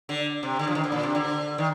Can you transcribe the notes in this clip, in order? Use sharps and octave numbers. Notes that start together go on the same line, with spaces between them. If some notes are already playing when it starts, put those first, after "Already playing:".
D3
C3
D3
F3
D#3
D3
A#2
C3
D3
D#3